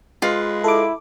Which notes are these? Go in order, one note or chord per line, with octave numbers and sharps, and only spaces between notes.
G#3 F4 B4
E4 A4 D6